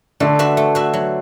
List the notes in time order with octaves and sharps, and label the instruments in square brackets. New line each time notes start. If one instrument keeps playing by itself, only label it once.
[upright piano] D3 [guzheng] A3
[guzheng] F#4 B4 E5
A3
F#4 B4 E5
F#3